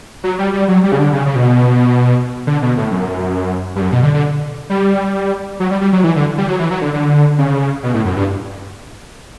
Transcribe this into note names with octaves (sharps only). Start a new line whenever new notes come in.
F#3
G3
G3
F#3
G3
C#3
D3
C#3
C#3
B2
D3
B2
A2
F#2
G2
F#2
B2
D3
D3
G3
F#3
G3
G3
F#3
E3
D3
G3
F#3
E3
F#3
D3
D3
C#3
B2
A2
F#2
G2